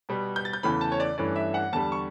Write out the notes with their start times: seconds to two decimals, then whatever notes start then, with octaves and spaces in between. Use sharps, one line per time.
0.09 B2 G3 B3
0.36 G6
0.45 A6
0.53 G6
0.63 E2 C#3 E3 A3 B5
0.81 A5
0.92 C#5
1.00 D5
1.18 G2 E3 A3 C#4 D5
1.36 E5
1.54 F#5
1.73 E2 D3 G3 A5
1.92 C#6